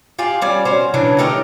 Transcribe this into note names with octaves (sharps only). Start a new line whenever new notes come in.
F4 G4 G#4
G3 C#4 D5
C#4 F#4 C5
C#3 E3 F#3 D4
A3 D#4 G4 A#4